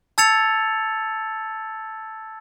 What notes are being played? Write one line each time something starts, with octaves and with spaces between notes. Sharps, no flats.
A5 E6 G#6 A6 C#7 F7